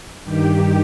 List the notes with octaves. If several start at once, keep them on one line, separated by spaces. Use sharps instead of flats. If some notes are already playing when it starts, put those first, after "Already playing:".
G2 D#3 G4